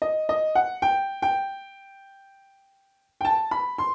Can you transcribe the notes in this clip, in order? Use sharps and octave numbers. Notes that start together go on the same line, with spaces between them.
D#5
D#5
F#5
G5
G5
G5
A5
B5
C6